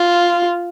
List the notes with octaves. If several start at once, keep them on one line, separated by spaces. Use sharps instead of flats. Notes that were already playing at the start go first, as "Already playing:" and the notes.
Already playing: F4